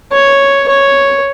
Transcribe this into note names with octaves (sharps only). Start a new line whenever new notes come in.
C#5
C#5